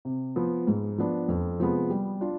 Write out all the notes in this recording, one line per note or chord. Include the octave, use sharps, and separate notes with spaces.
C3
F3 B3
G#2
F3 B3 D4
F2
C3 F3 G#3 B3
G3
D4 F4